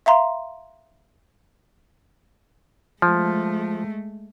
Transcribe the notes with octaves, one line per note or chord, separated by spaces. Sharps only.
E5 F5 A#5 C6
F3 G#3 A3